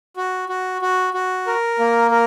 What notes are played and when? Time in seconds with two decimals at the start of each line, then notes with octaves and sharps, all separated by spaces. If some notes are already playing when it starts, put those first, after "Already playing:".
0.17 F#4
0.49 F#4
0.82 F#4
1.14 F#4
1.47 A#4
1.79 A#3
2.11 A#4